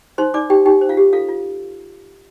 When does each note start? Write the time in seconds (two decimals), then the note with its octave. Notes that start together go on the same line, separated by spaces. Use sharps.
0.18 D#4 C5 C6
0.34 D#4 D5 D6
0.50 D#4 G4 G5
0.66 D#4 G4 G5
0.81 C5
0.89 F4 F5
0.97 G4
1.13 F4 A4 F5
1.29 F4